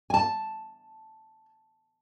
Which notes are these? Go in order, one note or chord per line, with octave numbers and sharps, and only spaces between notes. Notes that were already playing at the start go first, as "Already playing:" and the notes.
G#5 A5